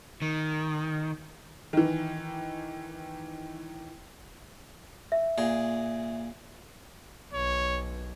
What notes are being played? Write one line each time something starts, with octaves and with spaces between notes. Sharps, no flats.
D#3
D#3 E3
E5
A#2 G#4
B1 C#5